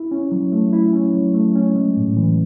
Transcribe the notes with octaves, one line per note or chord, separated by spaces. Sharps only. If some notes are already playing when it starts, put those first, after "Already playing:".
Already playing: E4
C#4
F#3
A3
E4
C#4
F#3
A3
C#4
G#3
A2
E3